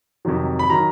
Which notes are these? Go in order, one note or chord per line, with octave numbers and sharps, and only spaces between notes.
F2 C3 D#3 F#3
B5
D#3 F#3 A#5